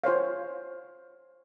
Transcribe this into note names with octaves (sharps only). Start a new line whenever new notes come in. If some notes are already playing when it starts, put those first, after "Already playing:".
F4 C5 C#5 F5